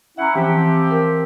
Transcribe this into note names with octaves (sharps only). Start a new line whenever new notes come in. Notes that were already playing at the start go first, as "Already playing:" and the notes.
C#4 E4 E5 F#5 A#5
E3 F3 C4 G4
A#4